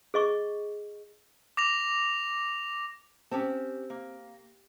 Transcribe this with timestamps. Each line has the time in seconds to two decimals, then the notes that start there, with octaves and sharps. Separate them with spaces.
0.14 G#4 D#5 C#6
1.57 D6 A#6 F7
3.31 C4 C#4 G4 A5
3.90 A#3